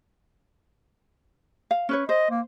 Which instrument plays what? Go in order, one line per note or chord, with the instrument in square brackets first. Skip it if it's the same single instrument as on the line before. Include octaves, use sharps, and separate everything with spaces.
[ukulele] F5
C#4 B4 C#5
[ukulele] C5 [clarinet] D#5
[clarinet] A#3